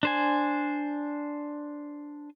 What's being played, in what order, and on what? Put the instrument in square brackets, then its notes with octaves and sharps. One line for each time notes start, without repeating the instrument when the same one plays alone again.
[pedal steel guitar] D4 C5 G#5